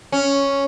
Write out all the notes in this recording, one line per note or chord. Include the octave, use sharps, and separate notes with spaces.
C#4